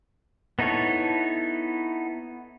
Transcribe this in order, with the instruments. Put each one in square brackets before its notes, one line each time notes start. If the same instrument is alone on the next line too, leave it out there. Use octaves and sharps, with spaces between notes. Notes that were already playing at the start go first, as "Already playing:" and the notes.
[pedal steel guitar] B3 D#4 E4 A4 C#5